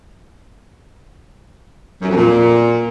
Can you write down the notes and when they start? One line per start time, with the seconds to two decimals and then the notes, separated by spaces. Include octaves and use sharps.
2.01 F#2
2.09 F2
2.16 A#2